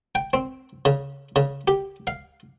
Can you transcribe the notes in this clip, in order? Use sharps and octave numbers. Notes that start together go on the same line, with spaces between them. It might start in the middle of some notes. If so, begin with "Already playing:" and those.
G5
C4
C#3
C#3
G4
F5